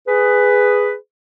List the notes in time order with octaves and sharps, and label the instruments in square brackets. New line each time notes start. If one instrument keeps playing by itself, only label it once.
[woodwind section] G#4 B4